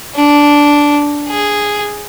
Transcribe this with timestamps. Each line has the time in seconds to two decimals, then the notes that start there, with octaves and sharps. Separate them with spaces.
0.15 D4
1.28 G#4